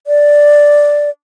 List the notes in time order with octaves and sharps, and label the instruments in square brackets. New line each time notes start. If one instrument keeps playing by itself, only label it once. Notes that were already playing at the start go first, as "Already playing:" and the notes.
[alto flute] D5